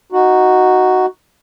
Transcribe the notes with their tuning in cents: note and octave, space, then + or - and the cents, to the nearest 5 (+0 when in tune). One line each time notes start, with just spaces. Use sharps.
D#4 +0 F#4 +0